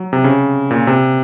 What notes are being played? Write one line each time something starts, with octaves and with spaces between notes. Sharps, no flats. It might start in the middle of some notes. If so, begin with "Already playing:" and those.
Already playing: F#3
C3
C#3
A#2
C3